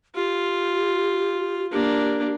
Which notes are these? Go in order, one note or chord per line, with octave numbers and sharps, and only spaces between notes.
F4 G4
A#3 D4 G4